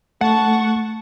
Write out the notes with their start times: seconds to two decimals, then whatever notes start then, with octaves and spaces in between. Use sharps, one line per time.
0.21 A3 F#5 A5 C#6